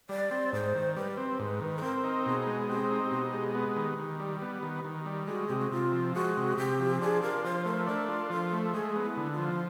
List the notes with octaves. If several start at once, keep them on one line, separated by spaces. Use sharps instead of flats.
G3 D5
C4
G#2 C5
D#3
G3 B4
C4
G#2
D#3
A4
C4 A#4
D#4
B2 G#4
G#3
C4 G4
D#4
B2 G4
G#3
B3
D#3
D#3
G3
B3
D#3
D#3
G3
G#3 F#4
C3 G4
F#4
C3 F4
F3
G#3 F#4
C3
C3 G4
F3
D4 G#4
F4 A#4
F3 C5
A3 A#4
D4 A#4
F4
F3 A4
A3
G#3 G#4
B3
E4
D3
F4
F3